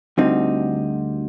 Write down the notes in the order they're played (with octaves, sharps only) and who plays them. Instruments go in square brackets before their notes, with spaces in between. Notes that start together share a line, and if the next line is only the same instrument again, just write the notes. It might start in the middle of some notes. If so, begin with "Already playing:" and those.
[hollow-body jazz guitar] D2 D3 G3 C4 D#4